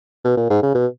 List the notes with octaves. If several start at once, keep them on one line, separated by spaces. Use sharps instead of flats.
B2
A#2
G#2
C#3
B2